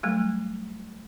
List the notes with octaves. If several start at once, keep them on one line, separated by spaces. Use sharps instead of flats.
F#3 G3 A3